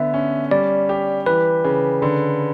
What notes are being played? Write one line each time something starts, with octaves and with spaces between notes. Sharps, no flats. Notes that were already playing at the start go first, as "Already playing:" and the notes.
Already playing: D3 B3 E5
C#4
G3 D5
G4
E3 B4
C#3
D3